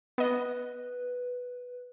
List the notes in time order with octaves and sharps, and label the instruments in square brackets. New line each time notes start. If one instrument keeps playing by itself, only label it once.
[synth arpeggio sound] B3 D#5 [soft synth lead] B4